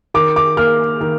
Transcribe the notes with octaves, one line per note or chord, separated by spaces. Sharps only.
D#3 D6
D6
A#3 F6
D#3